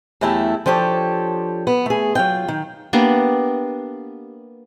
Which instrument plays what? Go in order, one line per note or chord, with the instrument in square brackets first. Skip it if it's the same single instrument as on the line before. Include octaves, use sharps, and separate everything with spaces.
[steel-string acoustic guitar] E2 F#3 A3 E4 G4 A4
F3 D4 G4 A4 C#5
B3
A3 G#4
F#3 F4 G5
D#3
[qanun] A#3 B3 D4 G4